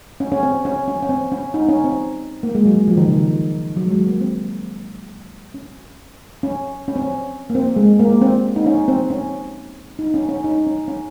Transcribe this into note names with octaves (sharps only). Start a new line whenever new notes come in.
C#4
C#4
C4
C#4
C#4
C#4
C4
C#4
D#4
C#4
C4
A#3
G#3
F#3
F3
D#3
C#3
D#3
F#3
G#3
F#3
A#3
C4
C#4
C#4
C#4
C4
C#4
A#3
C4
G#3
A#3
C4
D#4
C#4
C4
C#4
D#4
C#4
C#4
D#4
C#4
C#4